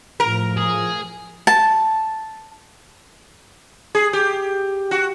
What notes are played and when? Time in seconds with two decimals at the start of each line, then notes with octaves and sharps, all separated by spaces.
0.20 A2 F3 A#4
0.57 G#4
1.47 A5
3.95 G#4
4.13 G4
4.91 F#4